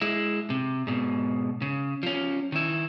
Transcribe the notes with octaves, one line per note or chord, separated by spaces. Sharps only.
G#3 E4
C3
G#2 B2
C#3
F3 C#4
D#3 E4